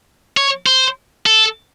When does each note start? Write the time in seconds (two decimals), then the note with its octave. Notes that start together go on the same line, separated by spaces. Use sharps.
0.37 C#5
0.66 C5
1.26 A4